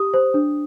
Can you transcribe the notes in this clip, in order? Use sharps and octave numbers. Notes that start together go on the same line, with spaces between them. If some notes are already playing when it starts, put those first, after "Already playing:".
Already playing: G4 D#6
C5
D4